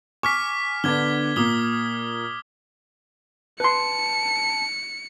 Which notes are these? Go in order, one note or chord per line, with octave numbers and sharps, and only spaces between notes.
G#5 C#6 D6 F6 B6
D3 B3 D4 D6 G#6 G7
A#2 A#3 D6 D#6 G7
B4 A5 C6 C#7